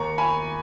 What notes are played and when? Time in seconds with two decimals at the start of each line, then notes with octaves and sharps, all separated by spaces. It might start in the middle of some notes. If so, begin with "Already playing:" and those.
Already playing: D#2 D#3 A#5 C#6
0.18 G#5 B5